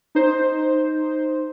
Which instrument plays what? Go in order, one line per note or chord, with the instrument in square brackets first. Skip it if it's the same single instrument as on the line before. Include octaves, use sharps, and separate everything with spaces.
[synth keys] D#4 C5